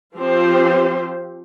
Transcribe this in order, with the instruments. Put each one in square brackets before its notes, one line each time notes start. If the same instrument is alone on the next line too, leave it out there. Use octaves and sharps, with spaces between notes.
[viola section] F3 C4 F4 G4 C5